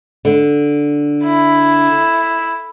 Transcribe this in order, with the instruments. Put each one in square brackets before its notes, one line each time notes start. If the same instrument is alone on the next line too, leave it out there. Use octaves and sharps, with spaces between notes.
[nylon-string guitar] D3
[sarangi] E4